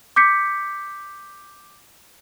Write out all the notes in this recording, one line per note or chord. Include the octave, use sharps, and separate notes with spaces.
D6 G6 B6 C#7